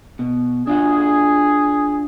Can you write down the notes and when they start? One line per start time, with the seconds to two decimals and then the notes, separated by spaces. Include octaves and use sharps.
0.19 B2
0.67 D4 F4 F#4 G#4